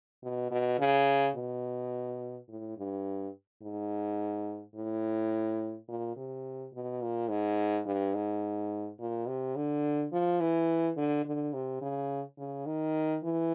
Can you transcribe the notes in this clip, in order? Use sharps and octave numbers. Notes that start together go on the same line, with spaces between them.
B2
B2
C#3
B2
A2
G2
G#2
A2
A#2
C3
B2
A#2
G#2
G2
G#2
A#2
C3
D3
F3
E3
D3
D3
C3
C#3
C#3
D#3
E3